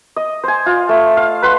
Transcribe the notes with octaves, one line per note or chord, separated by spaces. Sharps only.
D#5
C5 G#5
F4
A3
F5
B4 F5 F#5 C6